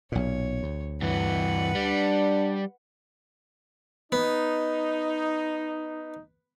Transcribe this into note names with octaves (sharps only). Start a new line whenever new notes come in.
B1 A#2 C#5
D2
G2 E3 B4 F#5
G3 D4
B3 D#4